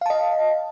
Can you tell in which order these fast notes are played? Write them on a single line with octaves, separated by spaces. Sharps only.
F5 A5 D#5